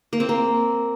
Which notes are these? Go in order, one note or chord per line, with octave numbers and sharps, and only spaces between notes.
A#3
C4
A#3